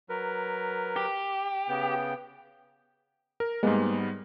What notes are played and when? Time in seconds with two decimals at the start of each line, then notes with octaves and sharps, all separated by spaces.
0.09 F#3 A#4 B4
0.96 G4
1.68 C#3 B3 G5
3.40 A#4
3.63 G#2 G3 G#3 A#3 B3